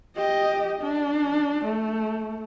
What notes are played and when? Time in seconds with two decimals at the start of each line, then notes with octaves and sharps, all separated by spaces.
0.17 G4 D#5
0.82 D4
1.65 A3